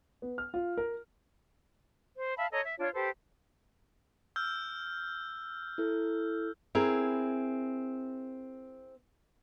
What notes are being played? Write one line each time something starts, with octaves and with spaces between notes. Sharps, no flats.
B3
F6
F4
A#4
C5
E5 F5 A5 B5
A4 C#5 D#5 A#5
E5
D4 F4 C#5
G4 A4 B4 C5
E6 F6 G6
E4 A4
C4 E4 G#4 A#4